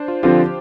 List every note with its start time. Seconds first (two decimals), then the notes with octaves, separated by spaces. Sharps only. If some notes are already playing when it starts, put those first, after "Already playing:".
Already playing: D4 C5
0.08 F4
0.23 D3 F3 C4 F4 G4